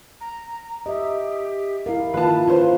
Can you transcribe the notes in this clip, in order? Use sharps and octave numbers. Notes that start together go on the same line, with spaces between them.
A#5
G4 D#5 E5
E4 A#4 F5
D#3 A#3 F4 B4 A5
C#4 F4 B4 C5